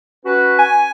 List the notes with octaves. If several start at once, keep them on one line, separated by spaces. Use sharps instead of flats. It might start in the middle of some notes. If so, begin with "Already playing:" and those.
C#4 F#4 B4
G#5